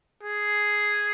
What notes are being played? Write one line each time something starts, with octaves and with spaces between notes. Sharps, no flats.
G#4